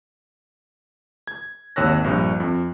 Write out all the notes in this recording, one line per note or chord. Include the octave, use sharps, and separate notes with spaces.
G#6
G#1 D#2 C#5 E6 F#6 A#6
A#1 G2
F2